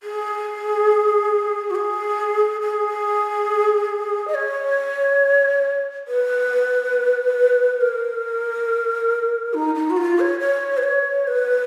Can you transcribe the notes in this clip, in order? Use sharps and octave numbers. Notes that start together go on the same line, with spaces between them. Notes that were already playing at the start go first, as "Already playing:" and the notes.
G#4
F#4
G#4
G#4
D#5
C#5
B4
A#4
D#4
D#4
F#4
F4
C#5
C#5
B4
C#5
B4